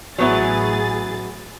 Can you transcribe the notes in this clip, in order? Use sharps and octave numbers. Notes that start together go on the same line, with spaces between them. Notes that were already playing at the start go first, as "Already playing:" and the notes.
A1 F#3 B3 E4 G#4 A6